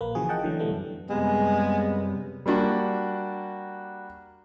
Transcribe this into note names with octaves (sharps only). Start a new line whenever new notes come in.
A#1 A#3 B4
C#3 E3 F3 F#4 G#4
D#5 F#5 G5 A5
D3 E3 F#3 A3
B2 E3 G3 A3 B3
F#2
F#2 C3 G3 G#3 B3
G3 A#3 D4 F#4